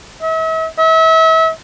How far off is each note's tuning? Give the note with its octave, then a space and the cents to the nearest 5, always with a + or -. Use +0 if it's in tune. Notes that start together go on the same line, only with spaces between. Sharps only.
E5 -40
E5 -35